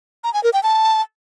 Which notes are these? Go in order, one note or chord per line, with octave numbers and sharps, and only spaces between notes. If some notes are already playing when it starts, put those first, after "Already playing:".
A#5
G#5
A#4
G5
A5